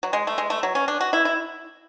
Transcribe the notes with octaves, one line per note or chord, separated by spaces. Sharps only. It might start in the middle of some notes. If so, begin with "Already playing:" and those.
F#3
G#3
A3
G#3
A3
F#3
C#4
D4
F#4
E4
E4